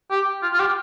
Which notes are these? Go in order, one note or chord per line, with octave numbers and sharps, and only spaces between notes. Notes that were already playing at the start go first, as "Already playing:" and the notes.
G4
F4
F4
G4